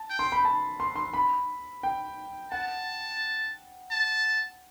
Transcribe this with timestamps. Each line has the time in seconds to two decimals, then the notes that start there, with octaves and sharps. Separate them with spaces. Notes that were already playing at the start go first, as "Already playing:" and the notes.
Already playing: A5
0.10 G5
0.19 C6
0.32 B5
0.45 A5
0.80 C6
0.96 C6
1.14 B5
1.83 G5
2.52 F#5 A5
3.91 A5